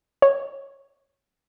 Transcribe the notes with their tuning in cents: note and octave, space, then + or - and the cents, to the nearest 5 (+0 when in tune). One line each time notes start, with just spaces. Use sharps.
C#5 -10